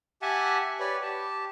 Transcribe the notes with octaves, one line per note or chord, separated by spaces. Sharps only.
G4 E5 F#5 G#5 A5
G4 B4 C#5 D5
G4 A5